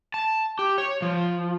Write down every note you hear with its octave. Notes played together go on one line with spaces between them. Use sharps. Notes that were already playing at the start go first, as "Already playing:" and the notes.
A5
G4
C#5
F3